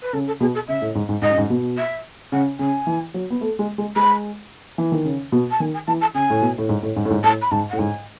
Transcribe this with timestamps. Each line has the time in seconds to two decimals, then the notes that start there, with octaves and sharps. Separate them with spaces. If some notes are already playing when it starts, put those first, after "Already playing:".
0.02 B4
0.13 C#3 A4
0.27 A4
0.40 B2 G#4
0.54 A4
0.68 C#3 E5
0.82 A2
0.95 G#2
1.09 G#2
1.22 G#2 D#5
1.30 F#2
1.38 G#2
1.50 B2
1.77 E5
2.32 C#3 F#5
2.59 C#3 G#5
2.87 E3
3.14 F#3
3.30 B3
3.41 A3
3.59 G#3
3.78 G#3
3.96 G#3 B5
4.78 E3
4.92 D#3
5.05 C#3
5.32 B2
5.50 A5
5.60 D#3 G#5
5.74 G#5
5.87 E3 A5
6.01 A5
6.14 C#3 G#5
6.30 A2
6.42 B2
6.58 A2
6.69 G#2
6.83 A2
6.96 G#2
7.05 A2
7.10 G#2
7.23 A2 A5
7.41 B5
7.51 G#2 A5
7.69 A2 F#5
7.78 G#2 G#5